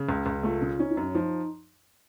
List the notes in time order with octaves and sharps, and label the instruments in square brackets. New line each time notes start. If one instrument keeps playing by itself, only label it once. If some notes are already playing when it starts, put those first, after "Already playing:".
Already playing: [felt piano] C#3
C#2
C#2
[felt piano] A3 [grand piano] F4
[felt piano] C#3
[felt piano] C#4 [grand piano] D#4
[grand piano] D#4
[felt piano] F#2
[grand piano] C#4
[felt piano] F3 [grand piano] D#4